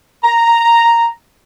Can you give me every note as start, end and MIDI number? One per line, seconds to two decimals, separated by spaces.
0.24 1.09 82